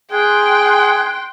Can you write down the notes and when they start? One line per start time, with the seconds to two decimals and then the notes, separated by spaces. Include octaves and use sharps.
0.12 G#4 G5 C6 F#6